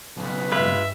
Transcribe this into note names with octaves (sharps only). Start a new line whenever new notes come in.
B1 C#3 B4
G2 G#3 F4 B4 E5